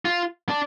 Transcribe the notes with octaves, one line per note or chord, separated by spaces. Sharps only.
F4
D4